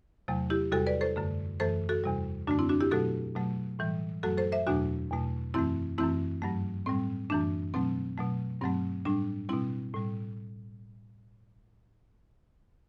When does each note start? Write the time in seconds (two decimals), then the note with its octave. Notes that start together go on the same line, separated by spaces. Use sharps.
0.28 E2 C3 F#3 A3
0.50 E4 G4
0.72 E2 C3 G3 F#4 A4
0.86 B4 D5
1.01 A4 C5
1.16 F#2 D3 A3
1.60 F#2 E3 A3 A4 C5
1.89 F#4 A4
2.04 E2 C3 G3
2.47 F#2 D3 A3 D4 F#4
2.59 C4 E4
2.69 D4 F#4
2.80 E4 G4
2.91 B2 F#3 A3 F#4 A4
3.36 B2 F#3 A3
3.79 A2 E3 G3
4.23 F#2 F#3 A3 F#4 A4
4.38 A4 C5
4.52 C5 E5
4.67 E2 B2 F#3 A3 D4 F#4
5.11 E2 B2 A3
5.54 F#2 E3 A3 C4 E4
5.98 F#2 E3 A3 C4 E4
6.42 G2 F#3 A3
6.86 A2 G3 C4
7.30 F#2 E3 A3 D4
7.74 B2 F#3 A3 C4
8.18 B2 F#3 A3
8.61 G2 F#3 A3 C4
9.05 A2 G3 D4
9.49 B2 G3 C4 E4
9.94 A2 G3